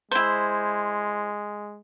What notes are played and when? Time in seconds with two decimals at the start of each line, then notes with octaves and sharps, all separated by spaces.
0.11 G#3 E4 C5